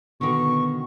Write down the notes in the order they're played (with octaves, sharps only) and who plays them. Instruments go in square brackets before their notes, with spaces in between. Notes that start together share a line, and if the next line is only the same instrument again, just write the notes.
[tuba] B2 [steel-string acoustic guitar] D3 D#3 [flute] C#6